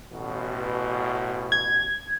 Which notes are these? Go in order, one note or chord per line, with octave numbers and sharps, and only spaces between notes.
A1 B2
G#6